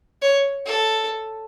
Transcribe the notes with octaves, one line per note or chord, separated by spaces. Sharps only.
C#5
A4